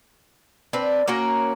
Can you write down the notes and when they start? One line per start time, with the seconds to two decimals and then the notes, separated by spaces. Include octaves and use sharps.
0.73 C4 D4 B4
1.08 A#3 C#4 F#4 A#4